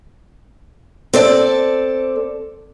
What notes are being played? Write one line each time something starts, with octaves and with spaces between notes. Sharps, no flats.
C4 A4 D5